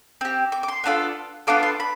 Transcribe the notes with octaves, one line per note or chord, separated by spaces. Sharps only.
C4 G4
D6
D6
C6
B3 D4 F4 A4
B3 D4 F4 A4 D6
C6
B5